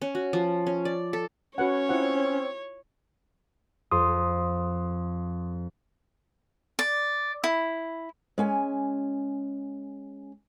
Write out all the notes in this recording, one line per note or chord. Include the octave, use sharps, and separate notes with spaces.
C#4
F#4
F3
C#4
D5
A4
C#4 F#4 B4 C#5 F#5
C4 E4 F4 F#5
F2 C6 D#6
D5
E4
G#3 C#4 G#5